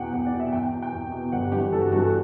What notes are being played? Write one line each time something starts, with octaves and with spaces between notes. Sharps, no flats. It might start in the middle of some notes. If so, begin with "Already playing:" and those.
Already playing: E2 B2 F#5 G5
E2 F#5
D5
B2
E5
E2 G5
G5
B2
G5
E2
B2
G1 F#5
G4
G2 E3 G4
G4
G1 A4
F#4
G2 E3 F#4
A4